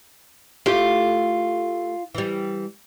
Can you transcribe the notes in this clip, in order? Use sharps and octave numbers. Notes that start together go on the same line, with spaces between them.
A3 E4 F4 G4
E3 G3